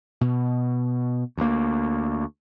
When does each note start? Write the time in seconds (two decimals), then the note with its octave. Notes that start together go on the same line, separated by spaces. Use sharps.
0.21 B2
1.37 D2 A#3